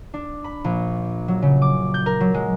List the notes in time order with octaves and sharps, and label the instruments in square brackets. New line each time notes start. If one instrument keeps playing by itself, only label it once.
[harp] D4
B5
A#1
F#3
C#3
D6
G6
A#4
F#3
G#3